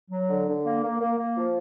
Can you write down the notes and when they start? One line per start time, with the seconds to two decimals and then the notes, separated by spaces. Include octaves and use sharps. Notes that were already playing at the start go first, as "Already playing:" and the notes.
0.11 F#3
0.29 D3
0.47 D3
0.64 A#3
0.82 A#3
1.00 A#3
1.17 A#3
1.36 F3